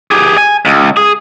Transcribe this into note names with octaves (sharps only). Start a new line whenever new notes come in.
G4 G#4
G#5
C#2
G#4